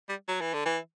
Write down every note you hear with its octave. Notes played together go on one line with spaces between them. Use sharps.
G3
F#3
E3
D3
E3